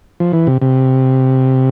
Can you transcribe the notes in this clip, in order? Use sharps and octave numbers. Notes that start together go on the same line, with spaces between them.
F3
E3
C3
C3